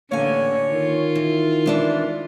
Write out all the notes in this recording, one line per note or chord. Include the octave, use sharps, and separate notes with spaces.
A1 D3 A#3 D4 C#5 G#5
D#3 F4
E3
E3 G#3 D4 E4